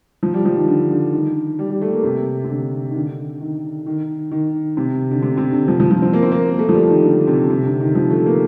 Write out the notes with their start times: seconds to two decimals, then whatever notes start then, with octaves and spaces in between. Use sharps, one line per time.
0.23 F3
0.34 G3
0.45 F3
0.57 D#3
0.68 D3
0.90 D3
1.13 D#3
1.59 G3
1.70 G3
1.82 A3
1.93 A#3
2.04 C3
2.44 C3
2.50 D3
2.91 D#3
2.95 D3
3.41 D#3
3.86 D#3
4.31 D#3
4.77 C3
5.11 D3
5.23 C3
5.37 C3
5.52 D3
5.68 F3
5.80 F3
5.91 F3
6.02 C4
6.13 A#3
6.22 C4
6.32 A#3
6.59 A3
6.69 F3
6.74 G3
6.90 D#3
7.04 D3
7.27 C3
7.50 C3
7.65 D3
7.80 D#3
7.95 F3
8.11 A3
8.26 A#3